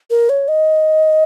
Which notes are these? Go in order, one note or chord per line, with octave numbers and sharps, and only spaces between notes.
A#4
C#5
D#5